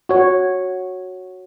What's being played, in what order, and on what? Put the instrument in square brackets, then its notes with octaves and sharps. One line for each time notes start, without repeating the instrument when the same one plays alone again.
[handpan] F#4 C#5